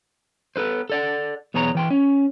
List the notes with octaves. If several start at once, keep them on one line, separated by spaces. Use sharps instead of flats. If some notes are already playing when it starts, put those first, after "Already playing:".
B3 A4 B4 C5
A4 D5 F#5
B1 E2 B3 G#4 C#5 A#5
E3 G5 C6
C#4